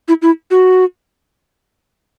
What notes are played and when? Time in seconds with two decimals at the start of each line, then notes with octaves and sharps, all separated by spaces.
0.08 E4
0.22 E4
0.51 F#4